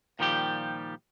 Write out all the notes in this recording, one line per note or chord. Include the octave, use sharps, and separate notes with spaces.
A#2 D#3 F3 G3 G4